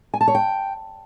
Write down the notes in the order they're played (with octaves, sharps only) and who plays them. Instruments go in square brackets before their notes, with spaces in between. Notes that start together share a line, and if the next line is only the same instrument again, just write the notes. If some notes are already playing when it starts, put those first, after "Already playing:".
[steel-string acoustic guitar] G#5
A5
C#5
G5